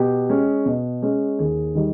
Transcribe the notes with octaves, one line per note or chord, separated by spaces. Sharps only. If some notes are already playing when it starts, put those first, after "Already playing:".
Already playing: B2 G4
G#3 C#4
B2
G#3 C#4
D#2 G#4
D#3 G3